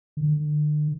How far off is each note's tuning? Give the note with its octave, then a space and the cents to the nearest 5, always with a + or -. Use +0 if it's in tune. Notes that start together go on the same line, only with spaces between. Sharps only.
D3 +35